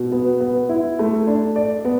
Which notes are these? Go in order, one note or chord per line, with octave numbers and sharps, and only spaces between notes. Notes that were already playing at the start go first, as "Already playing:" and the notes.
Already playing: B2
B3
B3
E4
A3
D4
D5
B3